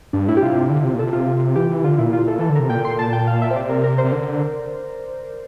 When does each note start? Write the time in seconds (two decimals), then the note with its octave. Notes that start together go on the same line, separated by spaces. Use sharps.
0.13 G2 D4
0.28 A2 E4
0.37 G4
0.42 C3 F4
0.70 D3
0.84 C3
0.94 A#2
0.99 C3 A4
1.13 F4
1.56 E3 G4
1.70 E3
1.84 D3 F4
1.98 A#2 E4
2.13 F4
2.28 A4
2.39 E3 A4
2.49 D3
2.55 C3 A#4
2.70 A#2 G5
2.85 C6
2.99 A5
3.13 G5
3.27 F5
3.42 E5
3.51 C5
3.55 C3 D5
3.69 A#4
3.84 A#4
3.98 C5
4.04 C3
4.12 D3